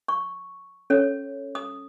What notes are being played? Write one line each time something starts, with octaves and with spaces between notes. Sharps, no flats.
C#6
C#4 A4 C#5
D#6